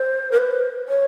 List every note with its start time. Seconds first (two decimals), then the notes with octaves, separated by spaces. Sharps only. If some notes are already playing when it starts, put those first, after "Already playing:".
Already playing: C5
0.32 A#4
0.38 B4
0.88 C#5